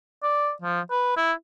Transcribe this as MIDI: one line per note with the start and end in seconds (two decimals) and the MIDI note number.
0.23 0.52 74
0.62 0.81 53
0.91 1.13 71
1.17 1.32 64